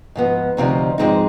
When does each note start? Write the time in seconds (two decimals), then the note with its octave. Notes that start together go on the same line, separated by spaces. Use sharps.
0.16 G#2 F3 B3
0.57 D2 C3 F3 C4 D#4
0.98 G#2 F3 G#3 C4 D#4